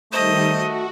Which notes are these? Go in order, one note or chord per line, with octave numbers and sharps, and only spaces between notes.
D#3 G3 A3 D#4 C5 D#5
F#4